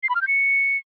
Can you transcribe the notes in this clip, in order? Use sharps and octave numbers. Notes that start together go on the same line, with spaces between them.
C7
B5
F6
G6
C#7